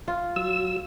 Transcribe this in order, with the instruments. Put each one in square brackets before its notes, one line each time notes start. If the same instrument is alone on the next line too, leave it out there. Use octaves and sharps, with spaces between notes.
[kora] F4
[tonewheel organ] F#3 E6